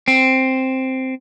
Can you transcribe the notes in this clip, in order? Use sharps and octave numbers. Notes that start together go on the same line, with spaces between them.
C4